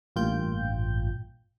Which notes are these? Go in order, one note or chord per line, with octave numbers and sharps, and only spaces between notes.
A1 G2 A#2 F4 G5 G6